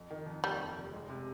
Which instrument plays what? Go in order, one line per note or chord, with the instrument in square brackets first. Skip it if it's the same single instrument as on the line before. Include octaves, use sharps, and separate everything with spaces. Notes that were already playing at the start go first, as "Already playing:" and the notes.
Already playing: [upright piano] F2
D#3
F2
[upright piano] D#2 [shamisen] G3
[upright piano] F1
F1
G#3
C3